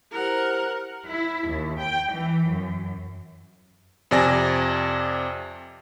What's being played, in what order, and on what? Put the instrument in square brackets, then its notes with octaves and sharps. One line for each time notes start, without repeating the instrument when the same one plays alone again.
[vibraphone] E4 G4 C5 [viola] A#4 F#5
[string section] E4
D#2
G5
E3
F#2
[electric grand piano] F2 C3 D5 G#5 A#6